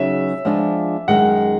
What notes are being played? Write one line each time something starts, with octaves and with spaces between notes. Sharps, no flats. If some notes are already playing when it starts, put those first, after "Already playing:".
Already playing: C#3 F#3 B3 D#4 G#4 E5
F3 G#3 B3 D4 F4
F#2 D#3 G#3 F#5